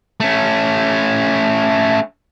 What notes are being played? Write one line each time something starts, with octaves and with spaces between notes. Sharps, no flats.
A3 C#4